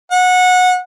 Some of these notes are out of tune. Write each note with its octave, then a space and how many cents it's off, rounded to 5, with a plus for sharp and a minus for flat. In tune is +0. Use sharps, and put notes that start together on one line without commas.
F#5 -20